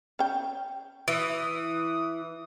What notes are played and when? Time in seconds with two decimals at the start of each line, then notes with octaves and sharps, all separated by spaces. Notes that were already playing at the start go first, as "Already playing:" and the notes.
0.19 C#4 G5
1.08 E3 D#6